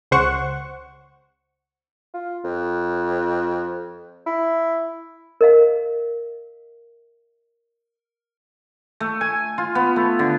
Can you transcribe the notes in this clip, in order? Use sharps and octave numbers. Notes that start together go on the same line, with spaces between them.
C#2 C#3 C5 F#5 C#6
F4
F2
E4
A#4 D#5 F5
A3
G#5
F4
B3
A3
D3